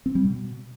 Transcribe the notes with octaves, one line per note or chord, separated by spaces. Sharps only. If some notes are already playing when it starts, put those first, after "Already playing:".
C4
G3
B2